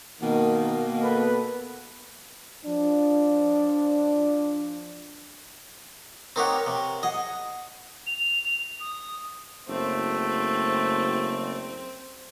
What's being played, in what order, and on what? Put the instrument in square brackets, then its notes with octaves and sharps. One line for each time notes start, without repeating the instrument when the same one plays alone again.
[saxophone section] B2 A#3 [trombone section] D#3
[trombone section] B3 A4 B4
[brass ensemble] F3 D4
[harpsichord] C4 D#4 G4 [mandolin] A#4 C#5 F#5
[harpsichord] C3
[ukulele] G#4 F#5 [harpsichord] D#5
[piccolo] F7
D#6
[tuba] F#1 [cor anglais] A3 [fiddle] C4